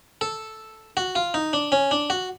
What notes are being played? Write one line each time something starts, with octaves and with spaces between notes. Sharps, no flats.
A4
F#4
F4
D#4
D4
C#4
D4
F#4